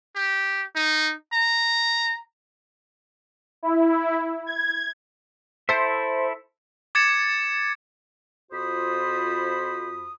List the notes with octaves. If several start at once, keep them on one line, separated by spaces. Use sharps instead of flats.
G4
D#4
A#5
E4
G#6
E4 A4 C5 E5
D6 G#6 A6 C#7 E7
F2 F4 F#4 C5 B5 D#6